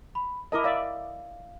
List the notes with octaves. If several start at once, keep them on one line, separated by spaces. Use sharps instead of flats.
B5
E4 A#4 D#5 A5 D6
D5 E5 F5